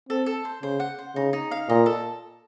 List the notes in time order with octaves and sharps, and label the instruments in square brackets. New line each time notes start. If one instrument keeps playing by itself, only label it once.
[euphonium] C4 [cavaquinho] A4
[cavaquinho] A4
C5
[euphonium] C#3 [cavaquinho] C5
[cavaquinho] F#5
C5
[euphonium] C#3 [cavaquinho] D#4
[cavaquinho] D#4
F5
[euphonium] A#2 [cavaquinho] D#5
[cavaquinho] A4